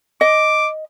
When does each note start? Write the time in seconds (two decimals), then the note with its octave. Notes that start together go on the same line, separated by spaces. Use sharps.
0.21 D#5 D6